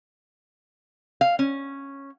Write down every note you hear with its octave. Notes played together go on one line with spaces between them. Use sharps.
F5
C#4